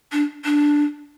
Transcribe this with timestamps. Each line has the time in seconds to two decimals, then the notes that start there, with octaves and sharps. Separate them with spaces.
0.12 D4
0.45 D4